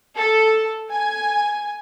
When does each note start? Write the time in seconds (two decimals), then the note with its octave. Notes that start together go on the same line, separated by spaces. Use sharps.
0.16 A4
0.91 G#5